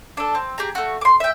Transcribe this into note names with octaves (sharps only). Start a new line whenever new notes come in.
D4 A4
C4
G4 G#4 A#5
A3 F#4
C6 D6
E5 G5